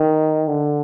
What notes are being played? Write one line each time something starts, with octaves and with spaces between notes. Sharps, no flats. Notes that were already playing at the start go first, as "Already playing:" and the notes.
Already playing: D#3
D3